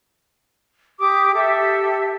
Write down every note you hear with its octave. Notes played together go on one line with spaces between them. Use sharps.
G4 D6 D#6
G4 A4 E5